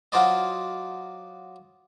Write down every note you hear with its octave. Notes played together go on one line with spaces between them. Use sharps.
F#3 F4 F#4 C5 D5 D#5